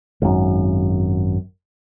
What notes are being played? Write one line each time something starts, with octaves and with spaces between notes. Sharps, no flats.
G#1 F#2